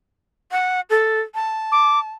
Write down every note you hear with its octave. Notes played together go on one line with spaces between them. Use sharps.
F#5
A4
A5
D6